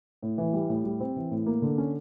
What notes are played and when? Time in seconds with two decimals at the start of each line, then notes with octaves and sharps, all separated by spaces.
0.23 A2
0.38 E3
0.53 G3
0.69 A2
0.84 G3
1.00 C4
1.16 E3
1.31 A2
1.46 A#3
1.62 D3
1.78 C#4